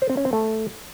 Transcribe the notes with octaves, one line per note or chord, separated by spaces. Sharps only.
C5
C4
C#4
C4
A3